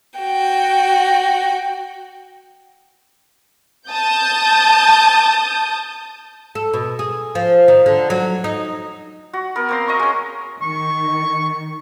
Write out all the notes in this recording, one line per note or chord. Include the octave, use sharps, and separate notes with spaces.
F#4 G5
A5 D#6 G6
A4
B2
G#4
F3
D#3
D3
F#3
D#4
F#4
B3 A#4
A#3 C4 C6
D#5 A#5 C#6
G#3 C#4
D#3 C#6